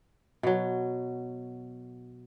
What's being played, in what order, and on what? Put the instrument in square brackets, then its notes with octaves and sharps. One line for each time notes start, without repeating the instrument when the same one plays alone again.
[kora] B2 F#3